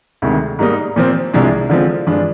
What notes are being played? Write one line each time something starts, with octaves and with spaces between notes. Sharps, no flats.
D2 C3 D#3 G#3
G#2 G3 A#3 D#4
A#2 F3 C4
C2 C3 F3 G#3 D4
D3 F3 G#3 C4 F4
G2 F3 G#3 D4 F4